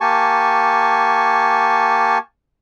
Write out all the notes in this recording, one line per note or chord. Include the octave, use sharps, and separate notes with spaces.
A#3 G4 G#5 A5 C#6